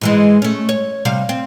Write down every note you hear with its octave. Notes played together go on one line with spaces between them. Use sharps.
G#2 E3 G#3
A3 C#4
C#5
C3 G3 F5
C4